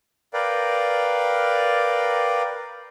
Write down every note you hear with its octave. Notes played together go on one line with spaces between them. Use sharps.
A#4 B4 D5 F5 G5